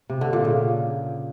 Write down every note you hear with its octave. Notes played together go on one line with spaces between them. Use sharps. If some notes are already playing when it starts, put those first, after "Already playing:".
C3
D3
A#2
C#3